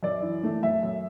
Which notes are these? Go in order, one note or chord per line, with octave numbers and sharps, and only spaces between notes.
F#2 D5
E3
A3
F#2 E5
F#2